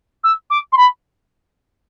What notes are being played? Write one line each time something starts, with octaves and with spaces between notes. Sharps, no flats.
E6
D6
C6
B5